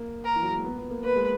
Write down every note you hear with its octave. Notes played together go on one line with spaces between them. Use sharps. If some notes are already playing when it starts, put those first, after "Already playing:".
Already playing: A#3
A#4
E3
F#3
G#3
A#3
B3
B3
A#3
A#3 B4
G#3